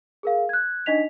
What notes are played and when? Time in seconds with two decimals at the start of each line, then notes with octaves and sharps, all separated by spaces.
0.23 G#4 A#4 F5
0.49 F#6 G#6
0.86 D4 D#4 D#5 B6 F7